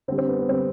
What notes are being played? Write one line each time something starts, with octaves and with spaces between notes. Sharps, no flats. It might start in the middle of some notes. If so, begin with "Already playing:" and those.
D3 G3 C4
C4
B3
B3
D3 G3 C4